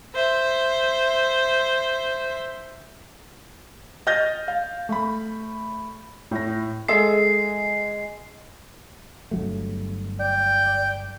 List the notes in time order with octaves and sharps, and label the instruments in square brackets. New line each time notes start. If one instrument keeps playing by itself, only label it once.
[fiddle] C5 E5
[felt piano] D#5 F6 G6 A6 A#6
F5
A3 B5
A2 A#6
[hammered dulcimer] G#3 [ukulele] G#4 A4 E5 [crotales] C7
[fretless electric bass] G1 F#3 A3
[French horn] D5 [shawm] G5